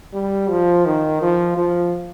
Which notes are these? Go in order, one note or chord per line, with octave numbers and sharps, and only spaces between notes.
G3
F3
D#3
F3
F3